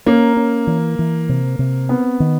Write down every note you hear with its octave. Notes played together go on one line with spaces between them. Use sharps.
A#3 C#4
C#4
E3
E3
C3
C3
B3 C4
D#3